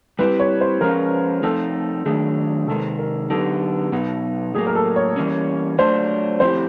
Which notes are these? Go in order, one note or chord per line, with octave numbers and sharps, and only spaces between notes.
G3 C4 E4 G4 B4
C#5
C5
F3 G#3 C#4 F4 A#4
F3 A3 C4 D#4 A4
D#3 F#3 A3 D4 G#4
C3 D#3 G#3 A4
A#4
D3 F#3 B3 D#4 G4 A4
B2 F#3 B3 D#4
A2 F#3 A#3 G#4
A#4
A4
C#5
E3 G3 A#3 C#4
F#3 A3 D4 F4 C5
F3 A3 C4 E4 G4 C5